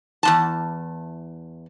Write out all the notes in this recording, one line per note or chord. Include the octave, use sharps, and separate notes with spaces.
E2 G#2 A5